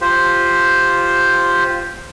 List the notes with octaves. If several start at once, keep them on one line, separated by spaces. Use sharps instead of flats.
F4 G4 C5